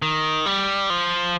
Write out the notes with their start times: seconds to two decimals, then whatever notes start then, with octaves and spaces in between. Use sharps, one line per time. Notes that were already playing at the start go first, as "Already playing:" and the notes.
0.02 D#3
0.46 G3
0.90 F3